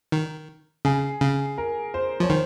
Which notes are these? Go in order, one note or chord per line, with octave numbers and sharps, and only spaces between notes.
D#3
C#3 G#4
C#3
A#4
C5
F3 C#5
D#3 C5